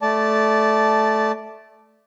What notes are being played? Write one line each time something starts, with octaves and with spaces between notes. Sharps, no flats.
A3 D5 A5